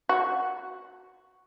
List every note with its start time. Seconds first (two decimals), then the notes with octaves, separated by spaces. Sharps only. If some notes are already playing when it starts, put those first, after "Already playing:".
0.09 F#4